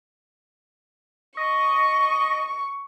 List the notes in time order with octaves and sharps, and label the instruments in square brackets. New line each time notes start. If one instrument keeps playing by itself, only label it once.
[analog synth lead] D#5 [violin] C#6